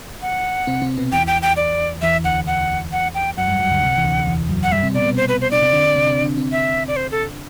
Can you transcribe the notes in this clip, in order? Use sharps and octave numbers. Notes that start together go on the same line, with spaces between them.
F#5
C3 C4
C3 C4
B2 B3
E2 E3 G5
G5
G5
D5
E2 E3 E5
D2 D3 F#5
E2 E3 F#5
F#5
G5
F#2 F#3 F#5
G2 G3
F#2 F#3
D2 D3
C2 C3
E3
D2 D3
E2 E3
F#2 F#3
F#5
G2 G3 E5
C3 C4
B2 B3 D5
B2 B3
C5
B4
C5
D4 D5
C3 C4
D3 D4
D3 D4
C3 C4
C3 C4
D3 D4
C3 C4
E5
D5
C5
A4